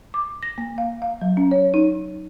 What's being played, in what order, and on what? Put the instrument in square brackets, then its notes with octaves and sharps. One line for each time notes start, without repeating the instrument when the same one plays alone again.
[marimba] D6
A#6
A#3
F5
F5
F#3
C#4
C#5
D#4